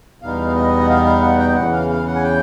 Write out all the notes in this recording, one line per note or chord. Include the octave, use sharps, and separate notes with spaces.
E2 B2 G3 B3 D#4 F5
D#5
F#5
F5
F5
F#5
G5
E2 C#3 E3 F#5
F5
F5
F#5
G#5
G5